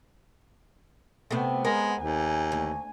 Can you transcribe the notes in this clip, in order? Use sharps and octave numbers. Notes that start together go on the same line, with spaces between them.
C3 A3 B3
G#3 A#4
D#2 G#5
D2